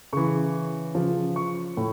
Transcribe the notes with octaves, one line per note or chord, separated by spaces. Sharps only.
C#3 E3 C#6
C#3 F3
C#6
A2